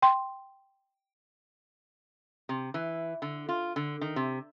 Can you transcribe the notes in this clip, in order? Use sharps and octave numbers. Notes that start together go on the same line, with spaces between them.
G5 C6
C3
E3
D3
F4
D3
D#3
C3